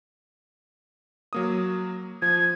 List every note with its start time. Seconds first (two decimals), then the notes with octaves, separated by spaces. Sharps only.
1.33 F#3 A#3 D#6
2.22 F3 G#6